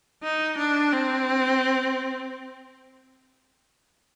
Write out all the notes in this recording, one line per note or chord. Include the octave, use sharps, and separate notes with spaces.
D#4
D4
C4